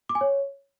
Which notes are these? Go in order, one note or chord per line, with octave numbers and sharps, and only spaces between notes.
D6
G#5
C#5